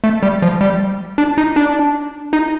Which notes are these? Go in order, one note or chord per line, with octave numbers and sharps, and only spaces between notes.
A3
G3
F3
G3
D4
D#4
D4
D#4